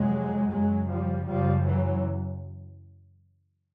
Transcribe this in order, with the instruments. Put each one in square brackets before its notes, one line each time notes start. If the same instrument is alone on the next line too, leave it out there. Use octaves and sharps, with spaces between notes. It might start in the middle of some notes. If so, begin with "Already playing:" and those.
Already playing: [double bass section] F2 C3 F#3 G#3
F#2 C#3 F#3 G#3
F3 G3
F#2 C#3 F3 G3
E3 F#3